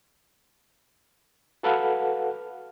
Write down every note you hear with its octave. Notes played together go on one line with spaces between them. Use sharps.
F#4 A4 B4 F5 F#5 F6